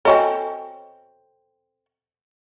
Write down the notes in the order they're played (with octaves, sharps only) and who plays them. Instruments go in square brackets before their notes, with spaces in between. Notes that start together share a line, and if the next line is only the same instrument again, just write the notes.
[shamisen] C4 F#4 A4 [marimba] C#5 D#5 G#5